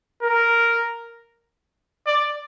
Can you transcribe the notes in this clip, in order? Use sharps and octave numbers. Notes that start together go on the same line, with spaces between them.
A#4
D5